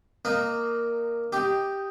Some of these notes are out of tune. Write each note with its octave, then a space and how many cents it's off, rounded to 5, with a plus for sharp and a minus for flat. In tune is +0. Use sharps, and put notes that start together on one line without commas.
A#3 +0 D#4 -20
D#4 +0 G4 +0